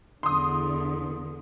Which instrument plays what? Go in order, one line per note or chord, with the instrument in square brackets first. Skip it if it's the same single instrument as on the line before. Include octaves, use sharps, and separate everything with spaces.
[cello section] E2 D3 [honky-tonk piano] C6 D#6